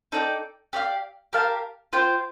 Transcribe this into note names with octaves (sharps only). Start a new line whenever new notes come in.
D#4 A4 D5 G5
G4 D5 F5
G4 A#4 F5 A5
F4 C5 G5